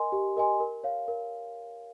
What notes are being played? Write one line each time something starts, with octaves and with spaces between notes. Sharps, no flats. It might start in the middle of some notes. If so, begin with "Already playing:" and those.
Already playing: A#4 D#5 G#5 C6
G4
A#4 D#5 G#5 C6
A#4
C#5 F5
A#4